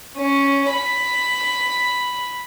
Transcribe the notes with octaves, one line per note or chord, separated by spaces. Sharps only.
C#4
B5